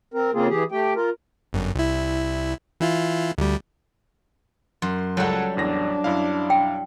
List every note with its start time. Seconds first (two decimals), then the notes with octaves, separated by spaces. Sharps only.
0.14 C4 A#4
0.34 C#3 A#3 C4 F4 G#4
0.49 E3 G4 G#4
0.72 A3 G4 G5
0.96 F4 A#4
1.53 G1 F#2
1.75 C2 E4
2.80 E3 E4 F4
3.38 D2 G3
4.82 F#2 C6
5.17 C#2 F#3 G3 A4 F#5
5.57 A1 E2 D4 A#6
6.04 F#2 E4 F5
6.50 G5